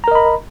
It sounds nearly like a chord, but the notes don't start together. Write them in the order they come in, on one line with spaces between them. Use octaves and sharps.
A#5 A#4 D#5 B5